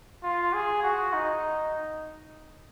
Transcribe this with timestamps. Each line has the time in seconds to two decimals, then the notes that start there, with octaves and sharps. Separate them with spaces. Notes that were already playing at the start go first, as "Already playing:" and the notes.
0.23 F4
0.53 G#4
0.83 F#4
1.14 D#4